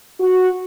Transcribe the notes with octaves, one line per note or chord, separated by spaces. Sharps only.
F#4